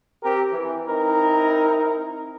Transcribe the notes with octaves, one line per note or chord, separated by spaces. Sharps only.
C4 G4 A#4
E3
C4 D#4 E4 A#4